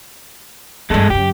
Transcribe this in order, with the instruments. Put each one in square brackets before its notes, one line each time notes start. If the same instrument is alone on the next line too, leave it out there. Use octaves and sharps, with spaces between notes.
[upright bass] E2 G2 [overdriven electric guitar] G#3 A4
[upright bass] F#2 C#3 [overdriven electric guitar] G4